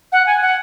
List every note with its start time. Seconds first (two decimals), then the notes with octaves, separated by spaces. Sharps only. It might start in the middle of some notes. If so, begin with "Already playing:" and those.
0.12 F#5
0.26 G#5
0.41 F#5